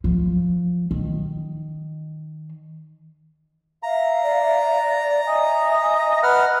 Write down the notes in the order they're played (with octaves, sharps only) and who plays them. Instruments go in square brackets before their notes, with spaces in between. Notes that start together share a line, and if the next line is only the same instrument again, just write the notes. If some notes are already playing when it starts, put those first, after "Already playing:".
[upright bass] F3
D#3
[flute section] E5 F5 [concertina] A#5
[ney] D5
[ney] D#5 [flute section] E5 G#5 D#6
[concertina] B4 F#5 F6